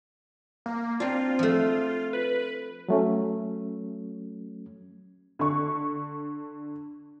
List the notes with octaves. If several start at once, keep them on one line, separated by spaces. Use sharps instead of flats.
A#3
C4 D4 F4
F3 A3
B4
F#3 A3 C#4
D3 C#6